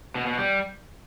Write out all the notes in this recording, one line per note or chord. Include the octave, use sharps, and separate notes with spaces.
B2
B2
G3